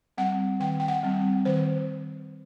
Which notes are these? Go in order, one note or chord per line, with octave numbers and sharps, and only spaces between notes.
G3 C4 F#5
D#3 G5
G5
F#5
G3 C4
D#3 C5